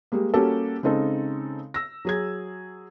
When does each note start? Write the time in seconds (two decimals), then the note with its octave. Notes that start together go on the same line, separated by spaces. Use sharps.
0.12 G3 G#3 A#3
0.34 G3 A#3 C#4 F#4 G4 A4
0.83 C#3 G#3 C4 D#4 A4
1.74 E6 A#6
2.05 F#3 G#4 G#6